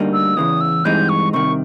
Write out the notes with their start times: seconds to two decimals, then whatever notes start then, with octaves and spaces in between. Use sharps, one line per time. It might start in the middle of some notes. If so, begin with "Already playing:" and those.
Already playing: D2 D3 G3 A#3 D#4
0.13 E6
0.37 E2 C#3 E3 D#6
0.61 E6
0.85 G2 E3 G#3 C4 D#4 G6
1.09 C#6
1.33 C2 C3 D#3 C#6